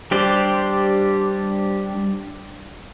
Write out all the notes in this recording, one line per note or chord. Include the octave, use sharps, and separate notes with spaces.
G3 D4 G4 C5 D5